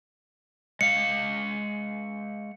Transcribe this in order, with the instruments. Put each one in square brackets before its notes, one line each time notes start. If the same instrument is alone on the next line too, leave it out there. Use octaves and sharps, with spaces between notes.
[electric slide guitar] G#3 F5 [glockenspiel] C#7